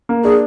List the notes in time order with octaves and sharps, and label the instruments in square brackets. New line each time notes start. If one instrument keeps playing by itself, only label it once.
[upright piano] A#3
[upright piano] D4 [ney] G#4